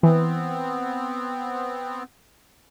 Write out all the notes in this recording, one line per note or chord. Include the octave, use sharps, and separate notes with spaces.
E3 B3 C4